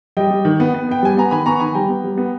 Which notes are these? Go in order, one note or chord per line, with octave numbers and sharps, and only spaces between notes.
G3 D#5 G5
G3
D#3
B3
B3
B3 G5
G3 G#5
B3 A#5
D#3 G#5 B5
B3 A#5 C#6
D#3 G#5 B5
G3 G5 A#5
B3
G3
B3